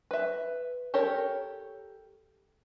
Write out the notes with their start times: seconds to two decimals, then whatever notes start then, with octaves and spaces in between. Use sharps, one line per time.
0.11 B4 E5
0.94 G4 A4 A#4 C#5